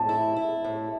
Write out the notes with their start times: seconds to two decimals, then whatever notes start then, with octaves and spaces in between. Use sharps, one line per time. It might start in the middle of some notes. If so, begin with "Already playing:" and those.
Already playing: A2 A5
0.09 E4
0.36 E4
0.64 A2